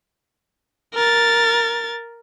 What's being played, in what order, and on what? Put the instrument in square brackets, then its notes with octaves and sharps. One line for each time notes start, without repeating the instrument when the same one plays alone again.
[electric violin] A#4 A6